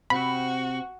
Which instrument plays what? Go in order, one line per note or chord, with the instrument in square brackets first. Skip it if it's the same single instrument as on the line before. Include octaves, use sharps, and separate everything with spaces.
[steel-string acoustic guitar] C3 C4 [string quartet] F#4 [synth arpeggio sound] B5